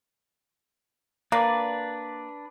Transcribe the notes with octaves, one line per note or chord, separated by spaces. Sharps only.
A#3 D4 B4 D5